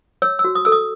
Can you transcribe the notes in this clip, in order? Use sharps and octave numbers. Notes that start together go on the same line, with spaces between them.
C#5 E6
E6
F#4
D#6
A4 E6
D#6